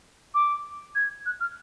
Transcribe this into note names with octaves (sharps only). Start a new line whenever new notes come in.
D6
G#6
F#6
F6